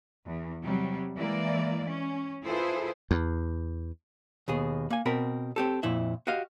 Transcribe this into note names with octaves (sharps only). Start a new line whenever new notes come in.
E2
C3 F#3 G3
E3 G#3 A#3 E4 D5
C#4
E4 F4 G#4 A4 B4 C5
E2
D#2 B2 G#4
A#3 G#5
B2 C4 A#4 B5
C4 G4 A4
F2 A#2 E4 E5
F#4 G4 D#5 F5